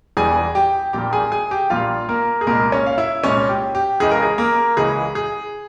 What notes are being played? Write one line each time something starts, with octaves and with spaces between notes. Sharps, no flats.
E1 E2 E3 G3 G#4 G#5
G4 G5
A#1 A#2 G3 A#3 G4 G5
G#4 G#5
G#4 G#5
G4 G5
A#1 A#2 G3 A#3 F4 F5
A#3 A#4
G#4
C2 A#2 G#3 A#3 A#4
C#4 C#5
F5
E4 E5
C2 A#2 G#3 C#4 C#5
G4
G4
C#2 C#3 E3 G#3 G#4
A#4
G#4
A#3 A#4
C#2 C#3 E3 G#3 G#4
G#4